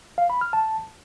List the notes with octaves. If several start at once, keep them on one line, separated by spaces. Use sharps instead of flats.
F5
B5
F6
A5